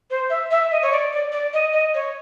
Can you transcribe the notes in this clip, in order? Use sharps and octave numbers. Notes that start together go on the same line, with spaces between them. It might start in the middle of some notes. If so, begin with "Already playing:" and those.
C5
E5
E5
D#5
C#5
D5
D5
D5
D#5
D#5
C#5